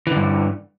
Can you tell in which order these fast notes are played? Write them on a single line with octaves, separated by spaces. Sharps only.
E3 D3 G2